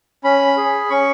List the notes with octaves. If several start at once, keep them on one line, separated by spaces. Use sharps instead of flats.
C#4 B5
G#4
C#4 C#6